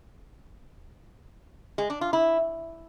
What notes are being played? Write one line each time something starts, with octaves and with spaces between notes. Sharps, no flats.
G#3
D4
F4
E4